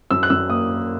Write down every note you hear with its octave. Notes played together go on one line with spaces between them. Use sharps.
F#2 E6
F#6
F#2 E6
A#3 D#6